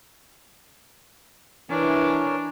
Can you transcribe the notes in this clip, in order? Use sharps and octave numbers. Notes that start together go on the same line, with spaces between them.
E3 D4 A#4 C#5 G#5